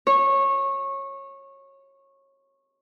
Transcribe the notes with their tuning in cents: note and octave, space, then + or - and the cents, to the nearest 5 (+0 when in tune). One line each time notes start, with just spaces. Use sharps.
C#5 -20